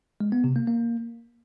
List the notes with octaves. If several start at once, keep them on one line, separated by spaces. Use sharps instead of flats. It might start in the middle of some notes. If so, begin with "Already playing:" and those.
G#3
B3
C3
A#3
A#3